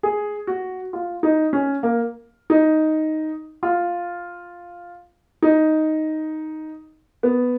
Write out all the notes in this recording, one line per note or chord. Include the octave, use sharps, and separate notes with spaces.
G#4
F#4
F4
D#4
C#4
A#3
D#4
F4
D#4
B3